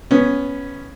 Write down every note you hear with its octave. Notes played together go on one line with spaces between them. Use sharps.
B3 C#4